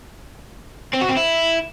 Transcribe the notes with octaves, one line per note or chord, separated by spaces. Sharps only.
C4
F#4
C4
E4